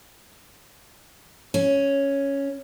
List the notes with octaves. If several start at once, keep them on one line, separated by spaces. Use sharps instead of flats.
C#4